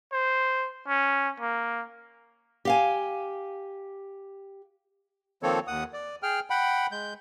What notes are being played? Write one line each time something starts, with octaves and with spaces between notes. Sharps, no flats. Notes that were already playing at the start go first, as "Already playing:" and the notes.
C5
C#4
A#3
G4 F5 G#5
D#3 F3 A#3 C4 A4 C#5
D#2 F#5 D#6
D5
G#4 G5 F6
F#5 G5 B5
G#3 G6